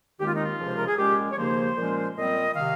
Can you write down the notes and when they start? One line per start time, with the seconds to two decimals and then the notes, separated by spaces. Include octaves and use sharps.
0.19 D#2 D#3 G#3 C4 G4
0.27 F4
0.35 D#4
0.42 F4
0.58 C#2 C3 F3 G#3
0.66 C5
0.76 A#4
0.87 G#4
0.97 A#2 G#3 C#4 G4
1.31 C#5
1.37 D#2 C#3 F3 A#3 C5
1.76 A#2 F3 G#3 C#4
2.15 A#2 G3 C4 D#5
2.55 C3 D#3 F5